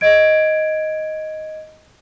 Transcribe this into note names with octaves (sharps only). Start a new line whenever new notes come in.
D#5 G#6 D7